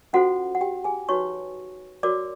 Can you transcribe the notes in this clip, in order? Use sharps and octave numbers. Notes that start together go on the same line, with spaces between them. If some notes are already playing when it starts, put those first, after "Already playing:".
C#4 F4 F#4 A4 C5 F#5
F#5
G4 G5
G#4 G#5
D#4 F#4 B4 C#5 C#6
F#4 A#4 C#5 D5 D6